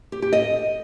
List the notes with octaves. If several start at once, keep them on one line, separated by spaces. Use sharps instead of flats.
G4
G4
D#5